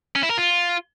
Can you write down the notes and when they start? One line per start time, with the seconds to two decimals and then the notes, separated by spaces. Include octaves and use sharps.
0.16 C#4
0.23 E4
0.30 A#4
0.38 F4